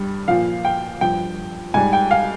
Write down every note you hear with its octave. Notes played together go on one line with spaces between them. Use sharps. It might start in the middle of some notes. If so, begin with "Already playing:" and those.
Already playing: G2 G3
A#2 F3 F5
G5
G2 F3 G5
G#2 G3 G#5
G5
F5